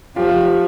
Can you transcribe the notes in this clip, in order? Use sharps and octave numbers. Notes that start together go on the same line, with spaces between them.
F3 F4 G4